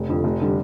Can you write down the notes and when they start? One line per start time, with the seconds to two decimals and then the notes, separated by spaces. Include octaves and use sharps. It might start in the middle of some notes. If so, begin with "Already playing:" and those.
Already playing: F1
0.08 F2 D3
0.24 F1
0.41 D3 G3